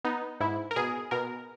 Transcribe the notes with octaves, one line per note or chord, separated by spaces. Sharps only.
B3 D#4
G#2 E4
A#4
B2 G#4
B2 A#4